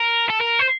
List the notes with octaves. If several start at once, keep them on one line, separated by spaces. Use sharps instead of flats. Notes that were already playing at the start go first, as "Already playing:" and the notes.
Already playing: A#4
A4
A#4
C5